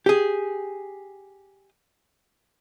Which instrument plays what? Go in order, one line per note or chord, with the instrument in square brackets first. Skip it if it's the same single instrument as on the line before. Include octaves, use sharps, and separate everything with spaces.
[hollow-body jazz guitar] G4 G#4